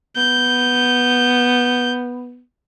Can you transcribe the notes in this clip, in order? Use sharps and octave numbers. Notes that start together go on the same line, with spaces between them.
B3 G6